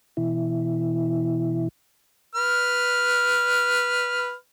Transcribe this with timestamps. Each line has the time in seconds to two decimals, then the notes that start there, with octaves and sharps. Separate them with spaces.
0.17 B2 E3 E4
2.35 B4 F6